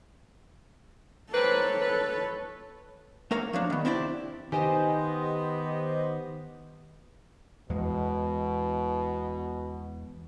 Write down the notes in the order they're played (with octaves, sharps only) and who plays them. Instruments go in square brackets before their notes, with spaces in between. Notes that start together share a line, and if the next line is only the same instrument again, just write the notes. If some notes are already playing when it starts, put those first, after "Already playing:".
[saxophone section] A#3 C4 B4 [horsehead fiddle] A4 C#5
[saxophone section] B4
[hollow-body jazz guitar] A3 A#3 A#4 C#5 F5
F3 F#3 D4
D#3 B3
C4 D4 E4 G4 D5
[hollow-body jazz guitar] D#3 [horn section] B3 [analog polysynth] G4 C5 D#5 [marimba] G#5
[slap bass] E2 G#3 [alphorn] B2